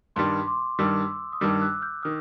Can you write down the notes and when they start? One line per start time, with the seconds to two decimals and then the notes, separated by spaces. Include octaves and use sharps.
0.16 G2 D#3 G3 C6 D6
0.47 C6 D6
0.79 G2 D#3 G3 D6 E6
1.32 D#6
1.41 G2 D#3 G3 D6 E6
1.61 E6 F#6
1.82 F6 G6
2.02 D#3 D#6 F6